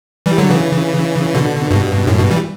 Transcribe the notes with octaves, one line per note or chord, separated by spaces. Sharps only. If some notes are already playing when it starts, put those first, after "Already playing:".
E3 G3
D3 F#3
C#3 E3
B2 D3
G2 B2
F#2 A2
G2 B2
E3 G3